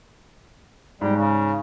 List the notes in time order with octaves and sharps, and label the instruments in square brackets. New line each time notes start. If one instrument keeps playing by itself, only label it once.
[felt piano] G#2 [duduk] G3
[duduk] C#3